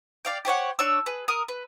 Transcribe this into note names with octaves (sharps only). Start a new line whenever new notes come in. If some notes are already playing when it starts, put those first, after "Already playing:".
D5 F5 G5
G4 C5 C#5 F#5
D4 C#5 E6
G#4 B4
A#4 D#6
B4